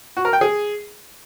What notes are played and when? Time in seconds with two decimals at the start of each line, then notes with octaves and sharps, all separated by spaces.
0.17 F#4
0.25 A#4
0.33 G5
0.41 G#4